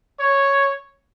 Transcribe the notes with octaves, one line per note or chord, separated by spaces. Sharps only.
C#5